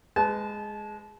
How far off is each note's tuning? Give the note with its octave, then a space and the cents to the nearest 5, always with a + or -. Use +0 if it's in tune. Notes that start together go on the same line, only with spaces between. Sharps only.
G#3 +0 B4 +25 A5 -25